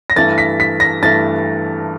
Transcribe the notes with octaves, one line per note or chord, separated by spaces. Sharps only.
A#6
G2 E3 A3 A6
B6
B6
A#6
G2 E3 A3 A6